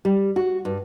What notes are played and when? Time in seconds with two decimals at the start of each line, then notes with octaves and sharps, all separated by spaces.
0.05 G3
0.36 F#4
0.65 G2